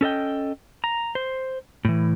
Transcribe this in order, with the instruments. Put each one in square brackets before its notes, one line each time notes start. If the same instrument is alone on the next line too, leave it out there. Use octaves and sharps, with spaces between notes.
[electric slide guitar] C#4 A4 D#5 G5
A#5
C5
A2 E3